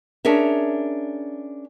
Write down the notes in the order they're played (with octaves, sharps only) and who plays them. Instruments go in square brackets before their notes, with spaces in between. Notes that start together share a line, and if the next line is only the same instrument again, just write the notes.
[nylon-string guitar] C#4 D4 G#4 A#4 E5